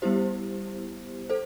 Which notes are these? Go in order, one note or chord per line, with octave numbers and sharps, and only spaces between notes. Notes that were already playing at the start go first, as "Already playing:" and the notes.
G3 B3 E4 G4 C5
A4 C5